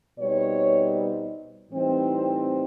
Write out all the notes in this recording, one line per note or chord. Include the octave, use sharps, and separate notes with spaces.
B2 G3 C4 D#4 C#5
A2 E3 G3 C4 D#4